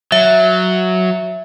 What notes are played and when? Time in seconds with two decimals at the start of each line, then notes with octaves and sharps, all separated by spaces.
0.12 F#3 E5